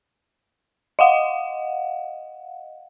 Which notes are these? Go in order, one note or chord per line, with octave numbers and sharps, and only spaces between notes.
D#5 F5 F#5